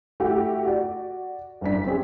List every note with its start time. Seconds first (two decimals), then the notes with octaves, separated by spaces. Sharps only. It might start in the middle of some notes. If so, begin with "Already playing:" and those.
0.20 A3 E4 F#4 G4
0.65 F#4 D5
1.61 F#1 F#2 D4 B6
1.86 C4 C#4 G4 G#4